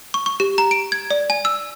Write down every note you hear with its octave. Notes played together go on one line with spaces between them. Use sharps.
C#6
C#6
G4
A#5
D7
G#6
D5
G#5
E6